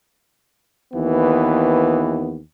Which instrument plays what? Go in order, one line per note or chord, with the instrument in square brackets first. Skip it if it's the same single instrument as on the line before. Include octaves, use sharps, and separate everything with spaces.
[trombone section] D#2 E3 B3